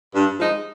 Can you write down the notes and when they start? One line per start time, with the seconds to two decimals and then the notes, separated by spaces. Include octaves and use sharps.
0.15 G2
0.37 F3 G#3 D#4